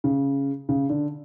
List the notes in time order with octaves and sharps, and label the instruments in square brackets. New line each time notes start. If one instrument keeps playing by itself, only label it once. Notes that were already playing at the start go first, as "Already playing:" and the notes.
[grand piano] C#3
C#3
D3